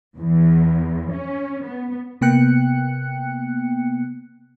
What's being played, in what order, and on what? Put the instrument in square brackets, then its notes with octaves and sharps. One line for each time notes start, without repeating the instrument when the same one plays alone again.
[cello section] E2
C#4
B3
[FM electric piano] C3 A#3 B3 G5 F#6 C#7